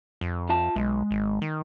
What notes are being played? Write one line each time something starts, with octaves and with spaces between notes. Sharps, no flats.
F2
F4 E5 A5
B1 G#3
G#1
D#3